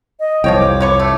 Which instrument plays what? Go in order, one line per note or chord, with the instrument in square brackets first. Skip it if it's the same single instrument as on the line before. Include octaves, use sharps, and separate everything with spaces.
[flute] D#5
[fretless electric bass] C2 F2 [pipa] F3 C#5 G5
[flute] D6
[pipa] B4 C#5 C#6
A3